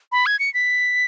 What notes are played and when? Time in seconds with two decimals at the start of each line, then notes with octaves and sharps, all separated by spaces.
0.12 B5
0.26 G#6
0.39 C#7
0.54 B6